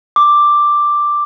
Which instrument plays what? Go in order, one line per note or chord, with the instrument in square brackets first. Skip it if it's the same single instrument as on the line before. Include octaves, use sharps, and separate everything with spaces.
[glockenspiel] D6